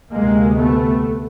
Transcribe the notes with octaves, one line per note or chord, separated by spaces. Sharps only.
D2 C3 G#3 A#3
A3 B3